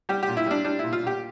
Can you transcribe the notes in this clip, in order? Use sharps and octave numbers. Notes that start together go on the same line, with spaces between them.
G3 G4
G4
A#2
E4
G3 D4
G3 D4
A#2 E4
F4
A#2 G4